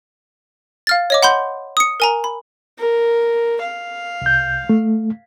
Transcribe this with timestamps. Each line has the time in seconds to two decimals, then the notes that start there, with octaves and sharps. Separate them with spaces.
0.87 F5 F6 A6
1.10 C#5 D#5 D6
1.23 F#5 B5 C6 G6
1.77 D#6 C#7
2.00 A#4 G#5 A#5
2.24 B5
2.79 A#4
3.63 F5
4.22 C2 G6
4.69 A3